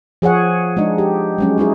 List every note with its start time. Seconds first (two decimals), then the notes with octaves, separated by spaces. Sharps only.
0.22 F3 G#4 C#5 F#5
0.77 G#3 D4 D#4
0.98 G4
1.38 F#3 G#3 C#4
1.58 G#3 D#4 E4 G#4